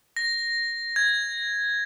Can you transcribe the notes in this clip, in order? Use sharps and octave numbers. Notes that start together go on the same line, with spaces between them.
A#6
G#6